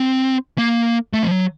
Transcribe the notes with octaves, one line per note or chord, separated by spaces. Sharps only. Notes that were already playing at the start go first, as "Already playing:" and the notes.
Already playing: C4
A#3
A3
F3
F#3